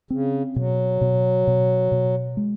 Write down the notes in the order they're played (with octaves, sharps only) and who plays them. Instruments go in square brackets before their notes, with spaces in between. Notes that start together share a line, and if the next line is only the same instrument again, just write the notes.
[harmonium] C#3 [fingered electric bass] C4
[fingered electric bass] B2 [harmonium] F#3
[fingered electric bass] B2
B2
B2
G#3